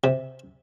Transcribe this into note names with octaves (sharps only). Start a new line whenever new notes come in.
C3